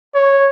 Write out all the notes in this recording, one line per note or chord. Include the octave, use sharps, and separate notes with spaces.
C#5